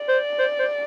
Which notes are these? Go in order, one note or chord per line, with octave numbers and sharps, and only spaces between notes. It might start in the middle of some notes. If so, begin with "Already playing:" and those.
Already playing: D5
C5
C5
C5